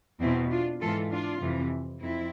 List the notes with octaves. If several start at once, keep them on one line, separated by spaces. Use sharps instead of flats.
E2 B2 C4 E4
D4 F4
G#2 E3 F4 A4
D4 F4
F2 C3 E3
F2 C4 E4